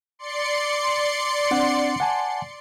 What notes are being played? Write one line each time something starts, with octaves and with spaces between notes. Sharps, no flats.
D5 C6 C#7
C4 D4 F#5
F#5 G#5 A5